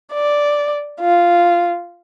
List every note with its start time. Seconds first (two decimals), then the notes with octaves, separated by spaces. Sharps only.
0.13 D5
1.01 F4